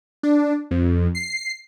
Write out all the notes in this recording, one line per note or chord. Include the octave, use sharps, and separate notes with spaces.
D4
F2
C7